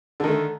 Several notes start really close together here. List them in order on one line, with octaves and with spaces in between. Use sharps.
D3 D#3 A3